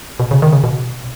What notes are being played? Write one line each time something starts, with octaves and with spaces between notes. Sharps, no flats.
B2
C#3
D#3
C#3
B2